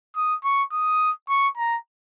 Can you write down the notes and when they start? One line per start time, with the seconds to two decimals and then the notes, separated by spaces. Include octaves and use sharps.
0.16 D#6
0.44 C#6
0.72 D#6
1.29 C#6
1.58 A#5